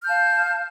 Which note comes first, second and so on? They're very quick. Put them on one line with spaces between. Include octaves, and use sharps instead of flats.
F6 G6 A5 F5